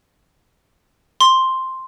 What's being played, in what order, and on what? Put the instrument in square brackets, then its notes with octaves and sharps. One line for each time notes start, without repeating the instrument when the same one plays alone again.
[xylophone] C6